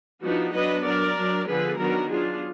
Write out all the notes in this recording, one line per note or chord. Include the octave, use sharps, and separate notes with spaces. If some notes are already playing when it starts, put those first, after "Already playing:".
F3 B3 D4 D#4 F#4
F#3 B3 D4 B4 D#5
F#3 D4 A#4 D5
F#3 D4
D3 F3 B3 G#4 B4
D#3 F#3 B3 D4 F#4 A#4
F#3 B3 D4 F4 G#4